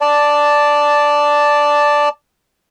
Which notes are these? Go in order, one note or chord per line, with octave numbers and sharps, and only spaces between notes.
D5 A5